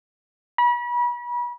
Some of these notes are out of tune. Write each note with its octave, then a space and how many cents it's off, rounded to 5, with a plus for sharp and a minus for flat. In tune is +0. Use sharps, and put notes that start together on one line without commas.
B5 -35